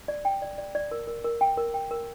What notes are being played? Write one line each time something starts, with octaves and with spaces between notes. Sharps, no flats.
D5
G5
D5
D5
D5
A#4
A#4
A#4
G5
A#4
G5
A#4